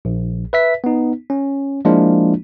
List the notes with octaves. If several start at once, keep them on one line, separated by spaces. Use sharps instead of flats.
A#1
B4 E5 B6
B3 D#4
C#4
F3 G#3 A#3 D4 E4 F4